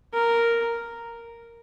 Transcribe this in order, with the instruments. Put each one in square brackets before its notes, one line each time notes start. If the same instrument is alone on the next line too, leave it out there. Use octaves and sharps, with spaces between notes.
[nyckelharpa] A#4